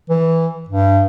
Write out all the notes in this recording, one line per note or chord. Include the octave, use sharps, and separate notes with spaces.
E3
G2